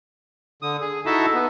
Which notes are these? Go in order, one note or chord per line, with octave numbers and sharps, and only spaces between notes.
D3 D#6
G#4
D#4 E4 F#4 A4 E5 A5
B3